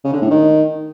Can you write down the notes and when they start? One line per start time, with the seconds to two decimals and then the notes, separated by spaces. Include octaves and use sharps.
0.04 C#3
0.13 D3
0.22 A2
0.30 D#3